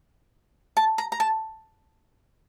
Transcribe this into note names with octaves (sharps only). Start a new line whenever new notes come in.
A5
A#5
A#5
A5